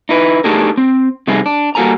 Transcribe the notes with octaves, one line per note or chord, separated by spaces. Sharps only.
D#4 E4 B4
A3 D4 D#4 G4 G#4 A#4
C4
C3 G3 A3 D#4 G#4
D4
G3 A#3 F#4 A4 G#5 A#5